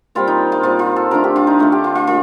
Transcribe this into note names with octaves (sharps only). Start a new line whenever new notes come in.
A#2 G3 C4 F4
D#4
F4
A#2 G3 C4 F4
F4
A4
D3 A3 D4 A#4
G4
F4
D#4
D3 A3 D4
G4
F4
F4
A#2 F4